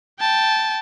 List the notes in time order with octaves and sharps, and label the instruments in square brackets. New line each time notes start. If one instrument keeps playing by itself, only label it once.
[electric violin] G5 A5